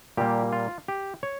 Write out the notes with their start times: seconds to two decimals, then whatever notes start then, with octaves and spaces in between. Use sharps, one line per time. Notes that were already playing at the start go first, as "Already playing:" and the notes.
0.17 A#2 G3 A#3 G4
0.53 F4
0.88 G4
1.23 C#5